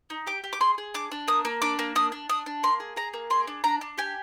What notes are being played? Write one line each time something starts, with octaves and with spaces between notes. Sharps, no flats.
D#4
G4 D6
G4
D6
G#4 C6
G#4
D4 D6
D4
A#3 D#6
A#3
D4 D6
A#3
D4 D#6
D4
D4 D#6
D4
A#3 C6
G#4
G#4 A#5
A#3
G#4 C6
D4
D4 A#5
D4
G4 G#5